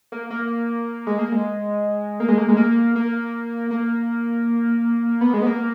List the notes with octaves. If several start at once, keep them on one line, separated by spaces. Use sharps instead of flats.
A#3
A#3
G#3
A#3
G#3
A#3
G#3
A#3
G#3
A#3
A#3
A#3
B3
G#3
B3
A#3